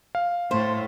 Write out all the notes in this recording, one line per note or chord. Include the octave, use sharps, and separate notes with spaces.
F5
A2 A3 C5